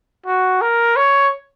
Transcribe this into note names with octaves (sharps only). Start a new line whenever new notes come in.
F#4
A#4
C#5